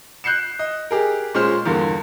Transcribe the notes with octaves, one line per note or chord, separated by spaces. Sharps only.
F#6 G6 C7 C#7 E7
D#5
G4 G#4 A#4
A#2 G#3 C#4 C5 C6 F6
E2 G2 D3 A#3